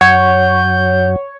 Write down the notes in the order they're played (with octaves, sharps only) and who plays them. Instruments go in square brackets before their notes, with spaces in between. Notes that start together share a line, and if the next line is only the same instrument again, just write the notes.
[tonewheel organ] F#2 [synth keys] C#5 [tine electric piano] F#5 [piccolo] G6